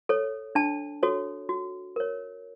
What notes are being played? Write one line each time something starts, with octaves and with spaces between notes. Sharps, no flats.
A4 C#5
D4 A5
F#4 A4 C#5
F#4
A#4 C#5